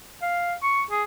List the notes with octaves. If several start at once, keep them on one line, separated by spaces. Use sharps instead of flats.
F5
C#6
G#4